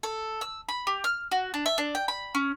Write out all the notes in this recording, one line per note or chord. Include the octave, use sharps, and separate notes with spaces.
A4
E6
B5
G4
F6
F#4
D4
E5
D4
G5
B5
C#4